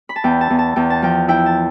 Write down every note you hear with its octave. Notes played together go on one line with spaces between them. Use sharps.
B5
A5
E2 G5
A5
E2
A5
E2 G5
A5
F3 G5
E4 G5
A5